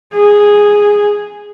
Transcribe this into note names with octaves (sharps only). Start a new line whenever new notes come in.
G#4